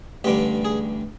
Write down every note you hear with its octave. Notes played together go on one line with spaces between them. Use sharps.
A1 G2 D3 G3 G4
G#4